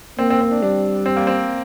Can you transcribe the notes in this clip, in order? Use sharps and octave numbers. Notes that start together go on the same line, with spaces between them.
A#3 C4
C4
C4
D4
G3 D4
C4
A#3
C4